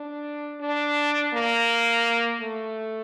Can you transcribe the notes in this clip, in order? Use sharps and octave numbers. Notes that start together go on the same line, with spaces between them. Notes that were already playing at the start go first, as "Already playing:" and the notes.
Already playing: D4
D4
A#3
A3